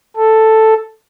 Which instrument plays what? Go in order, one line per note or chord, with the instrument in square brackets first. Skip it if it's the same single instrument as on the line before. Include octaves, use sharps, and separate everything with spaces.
[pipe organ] A4